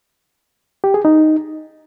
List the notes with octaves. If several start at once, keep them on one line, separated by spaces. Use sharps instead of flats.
G4
G#4
D#4